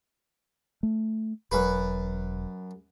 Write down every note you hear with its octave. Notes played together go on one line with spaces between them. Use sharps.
A3
E1 F#2 B4